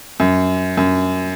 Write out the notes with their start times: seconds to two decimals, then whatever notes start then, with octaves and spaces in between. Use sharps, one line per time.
0.20 F#2
0.77 F#2